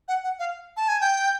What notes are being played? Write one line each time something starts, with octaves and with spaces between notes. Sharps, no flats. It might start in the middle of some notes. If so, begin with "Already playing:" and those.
F#5
F#5
F5
A5
G#5
G5